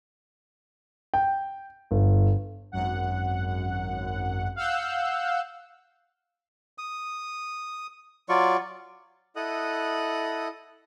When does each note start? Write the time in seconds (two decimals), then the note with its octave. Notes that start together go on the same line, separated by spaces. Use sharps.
1.14 G5
1.91 G1
2.72 G#1 F#2 F#5
4.56 F5 F#5 E6 F#6 G6
6.78 D#6
8.29 F#3 F4 D5 C#6
9.36 E4 A4 D#5 F#5 D#6 F#6